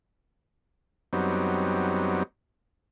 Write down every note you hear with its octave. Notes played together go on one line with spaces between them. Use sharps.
F#2 F#3 G3 B3 C4 D#4